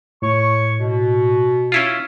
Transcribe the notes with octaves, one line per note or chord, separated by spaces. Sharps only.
A2 C#5 C#6
B2
C#4 E4 F4